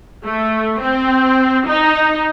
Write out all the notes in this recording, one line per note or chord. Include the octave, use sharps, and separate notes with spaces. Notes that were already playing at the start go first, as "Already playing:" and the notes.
A3
C4
D#4